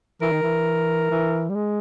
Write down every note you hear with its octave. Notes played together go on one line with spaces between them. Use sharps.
E3 A#4
D#3
E3
E3
G3
G#3